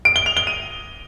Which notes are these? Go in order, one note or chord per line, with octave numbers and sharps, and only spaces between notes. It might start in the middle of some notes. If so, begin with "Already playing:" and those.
D7
G7
F7
G7
D#7